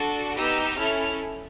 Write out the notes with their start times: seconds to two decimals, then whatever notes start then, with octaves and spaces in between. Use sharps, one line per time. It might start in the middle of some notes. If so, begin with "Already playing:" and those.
Already playing: D4 F#4 A4
0.35 B3 D#4 G4 E6
0.77 C#4 E4 A4 F6